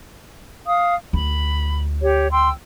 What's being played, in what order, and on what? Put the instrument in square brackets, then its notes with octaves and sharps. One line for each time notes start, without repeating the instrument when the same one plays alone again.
[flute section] F5 D#6
[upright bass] D2 [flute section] B5
[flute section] G4 C#5
G5 C6 E6